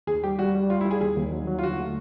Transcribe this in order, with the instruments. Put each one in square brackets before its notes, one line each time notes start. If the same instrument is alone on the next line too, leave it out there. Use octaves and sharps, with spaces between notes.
[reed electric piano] D#2 [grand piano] G#4
[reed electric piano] G3 [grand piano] G4
[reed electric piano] G3 [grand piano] F#4
[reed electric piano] G3
[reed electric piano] G3 [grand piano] F4
[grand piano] E4
[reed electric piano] G3
[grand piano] G#4
[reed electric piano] D#2 [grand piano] G#4
[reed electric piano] D#2
F#3
F#3
[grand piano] F4
[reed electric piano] D3 [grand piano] F#4
[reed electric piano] A3